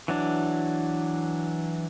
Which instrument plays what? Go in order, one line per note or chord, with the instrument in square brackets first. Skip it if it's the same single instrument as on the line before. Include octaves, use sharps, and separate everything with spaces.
[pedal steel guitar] E3 F#3 D4